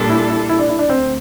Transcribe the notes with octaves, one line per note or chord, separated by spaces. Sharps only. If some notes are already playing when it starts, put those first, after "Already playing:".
Already playing: A#2 G3 D4 A4
E4
E4
E4
D4
E4
D4
D2 C4